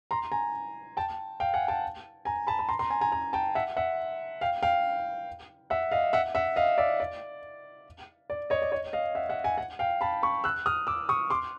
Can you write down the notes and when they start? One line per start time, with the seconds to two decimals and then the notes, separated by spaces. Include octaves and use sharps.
0.11 A#5 C6
0.32 G#5 A#5
0.97 G5 A5
1.40 F5 G5
1.54 F#5 G#5
1.68 G5 A5
2.25 G#5 A#5
2.47 A5 B5
2.59 B5
2.68 A#5 C6
2.79 A#5 C6
2.90 G#5 A#5
3.01 G#5 A#5
3.12 G#5 A#5
3.33 G5 A5
3.55 E5 F#5
3.77 E5 F#5
4.41 F5 G5
4.63 F5 G5
5.70 E5 F#5
5.92 D#5 F5
6.13 E5 F#5
6.35 E5 F#5
6.56 D#5 F5
6.78 D5 E5
7.00 D5
8.30 D5
8.50 C#5 D#5
8.62 D5
8.72 C#5 D#5
8.93 D#5 F5
9.15 E5 F#5
9.29 E5 F#5
9.44 F#5 G#5
9.58 F#5 G#5
9.79 F5 G5
10.01 A5 B5
10.23 B5 C#6
10.44 E6 F#6
10.66 D#6 F6
10.87 D6 E6
11.09 C#6 D#6
11.30 C6 D6